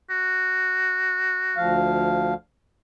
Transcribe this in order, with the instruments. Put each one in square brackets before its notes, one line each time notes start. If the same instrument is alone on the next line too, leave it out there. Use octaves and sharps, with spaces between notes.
[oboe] F#4
[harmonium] D2 F3 F5